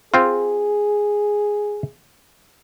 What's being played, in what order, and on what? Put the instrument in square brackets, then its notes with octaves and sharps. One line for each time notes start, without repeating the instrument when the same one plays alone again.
[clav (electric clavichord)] C4 F4 [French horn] G#4